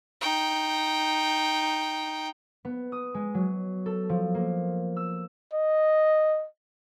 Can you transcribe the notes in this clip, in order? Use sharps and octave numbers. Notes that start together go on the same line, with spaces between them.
D#4 G5
B3
D#6
G#3
F#3
A4
F3
A#3
E6
D#5